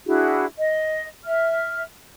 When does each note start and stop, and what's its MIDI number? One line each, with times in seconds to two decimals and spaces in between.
0.06 0.46 62
0.06 0.46 64
0.06 0.46 66
0.06 0.46 68
0.58 1.07 75
1.25 1.82 76
1.25 1.82 89